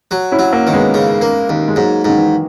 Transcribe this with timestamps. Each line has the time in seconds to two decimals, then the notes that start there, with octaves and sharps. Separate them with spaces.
0.11 F#3
0.31 C#4 E4
0.39 F#3
0.53 A#3 C#4
0.67 D#3
0.73 G#3 B3
0.94 C#3
1.21 A#3
1.49 D#2
1.68 G#3
1.76 G#2 F#3 A#3
2.05 G#2 D#3
2.18 E3